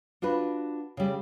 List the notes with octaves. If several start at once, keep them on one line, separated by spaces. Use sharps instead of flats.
D4 F4 F#4 B4
C#3 G3